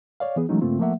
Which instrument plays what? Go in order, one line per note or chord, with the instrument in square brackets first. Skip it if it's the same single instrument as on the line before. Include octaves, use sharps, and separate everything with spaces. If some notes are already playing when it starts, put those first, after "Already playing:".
[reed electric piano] C#5 D5 F5
E3 B3 G#4
E3 F#3 G#3 A3 C#4 D#4
G2 C#3 A3 A#3 C4 F4
F3 A3 A#3 E5 F#5